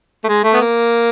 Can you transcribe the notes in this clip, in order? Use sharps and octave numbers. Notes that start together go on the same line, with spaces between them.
A3
G#3
A3
B3
A#3